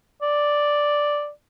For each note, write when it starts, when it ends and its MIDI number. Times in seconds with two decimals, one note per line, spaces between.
0.22 1.30 74